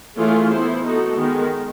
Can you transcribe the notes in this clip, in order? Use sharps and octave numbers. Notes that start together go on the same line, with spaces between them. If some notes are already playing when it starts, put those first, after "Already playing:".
E3 A3 C#4 F4 G#4
B3 E4 A4 C5
B3 D#4 F#4 A4
D#3 G#3 B3